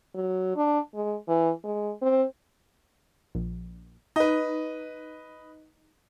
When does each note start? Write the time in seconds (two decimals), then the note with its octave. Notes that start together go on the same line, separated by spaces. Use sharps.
0.14 F#3
0.56 D4
0.94 G#3
1.28 E3
1.64 G#3
2.02 C4
3.35 A#1
4.16 D#4 B4 D#5